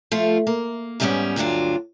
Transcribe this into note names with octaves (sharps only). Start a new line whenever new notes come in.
F3 A3 F4
A#3
E2 G#2 G3 A3 B3 C#4
D2 G2 F#3 D4 F4